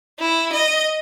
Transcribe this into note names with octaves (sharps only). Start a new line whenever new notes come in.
E4
D#5